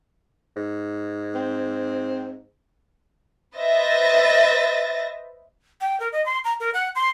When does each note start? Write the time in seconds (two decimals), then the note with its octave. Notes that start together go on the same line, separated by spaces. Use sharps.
0.57 G#2
1.35 C4
3.56 B4 C5 D#5 E5 A6 A#6
5.81 G5
6.00 A#4
6.12 D#5
6.26 C6
6.45 A#5
6.60 A#4
6.74 F#5
6.96 C6